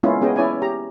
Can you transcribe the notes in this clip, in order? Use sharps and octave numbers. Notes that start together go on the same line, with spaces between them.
G#3 A#3 B3 C#4 E4 F4
B3 C#4 G#4 D#5 G5
C#4 E4 C#5 D5 G#5
G4 A#5